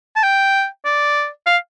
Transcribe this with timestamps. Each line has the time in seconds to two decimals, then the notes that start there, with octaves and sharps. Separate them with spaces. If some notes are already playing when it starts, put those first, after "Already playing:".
0.16 A5
0.23 G5
0.85 D5
1.46 F5